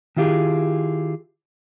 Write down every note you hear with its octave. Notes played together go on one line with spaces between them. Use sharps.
D#3 E4 F4 G4 G#4